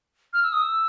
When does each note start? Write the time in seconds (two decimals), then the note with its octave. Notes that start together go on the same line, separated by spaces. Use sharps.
0.33 F6
0.43 E6
0.52 D#6
0.62 E6